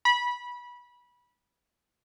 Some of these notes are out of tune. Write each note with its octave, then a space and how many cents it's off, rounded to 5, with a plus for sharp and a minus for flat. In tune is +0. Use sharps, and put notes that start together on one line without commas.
B5 -20